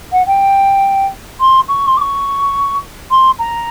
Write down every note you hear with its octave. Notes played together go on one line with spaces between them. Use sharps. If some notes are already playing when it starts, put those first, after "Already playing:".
F#5
G5
C6
C#6
C6
D6
C#6
C6
A#5